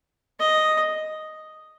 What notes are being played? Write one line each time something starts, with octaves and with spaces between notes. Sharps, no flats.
D#5